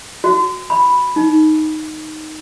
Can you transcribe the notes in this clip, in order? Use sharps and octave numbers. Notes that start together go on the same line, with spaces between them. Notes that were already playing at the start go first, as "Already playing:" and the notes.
F#4
B5
D#4